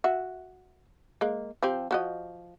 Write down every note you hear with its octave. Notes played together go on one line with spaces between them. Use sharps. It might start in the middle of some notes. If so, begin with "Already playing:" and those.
F#4 E5
G#3 A#3
F3 C4 G4
F3 F#4 D#5